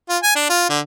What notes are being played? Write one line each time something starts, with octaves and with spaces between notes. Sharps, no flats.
F4
G#5
D4
F4
D3